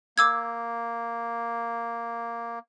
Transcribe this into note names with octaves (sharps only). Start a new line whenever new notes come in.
A#3 D6 E6 G#6